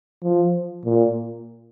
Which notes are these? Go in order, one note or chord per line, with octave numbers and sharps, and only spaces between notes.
F3
A#2